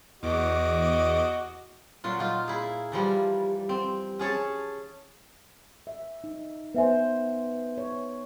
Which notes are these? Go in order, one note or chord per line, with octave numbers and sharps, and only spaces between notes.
E2 F#4 D#5 D6
A#2 F#3 F4
A#3 D#4 F4
E4 G#4
E3 F3 G3
C4
C#4 G#4 C#5 A5
E5
D#4
B3 B4 C5 E5 G#5
C#5